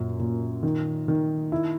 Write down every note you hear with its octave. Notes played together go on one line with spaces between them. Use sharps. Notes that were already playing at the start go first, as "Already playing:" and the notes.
Already playing: F#2 A#2
A#2
D#3
D#3
E4